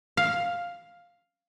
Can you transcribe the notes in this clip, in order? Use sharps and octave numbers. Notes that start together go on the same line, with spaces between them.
F5